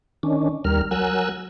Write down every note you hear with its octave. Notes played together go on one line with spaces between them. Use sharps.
D#3 C#4 D4
D#2 G3 A#4 F6
F#3 A#4 G#5 E6 F#6